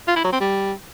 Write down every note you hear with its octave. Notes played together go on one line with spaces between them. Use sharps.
F4
E4
F#3
C4
G3